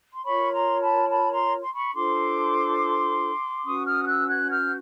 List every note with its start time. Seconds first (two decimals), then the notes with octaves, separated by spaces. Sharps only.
0.13 C6
0.24 F4 A#4 C#5 B5 C#6
0.52 A#5 C6
0.80 A5 B5
1.08 A5 B5
1.30 A#5 C6
1.62 C6
1.73 B5 C#6
1.94 D4 F4 A4 C5 C6 D6
3.65 C#4 F#4 B4 C#6 D#6
3.86 D#6 F6
4.03 F6
4.07 E6 F#6
4.29 F#6 G#6
4.50 F6 G6